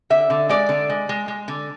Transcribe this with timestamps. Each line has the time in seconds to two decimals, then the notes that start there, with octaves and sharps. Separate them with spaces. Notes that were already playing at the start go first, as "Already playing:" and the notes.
0.10 D3 E5
0.30 D3
0.49 G#3 D5
0.69 D3
0.90 G#3
1.09 G#3
1.28 G#3
1.48 D3